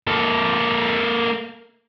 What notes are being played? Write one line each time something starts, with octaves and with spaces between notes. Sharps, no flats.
A#3 A4